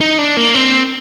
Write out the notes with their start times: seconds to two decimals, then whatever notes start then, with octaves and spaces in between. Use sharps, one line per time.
0.01 D#4
0.19 D4
0.37 A#3
0.55 C4